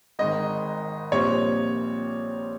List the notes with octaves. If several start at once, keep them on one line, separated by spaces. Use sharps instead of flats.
G#1 G#2 D#3 D#5
A#1 A#2 G3 C4 C#5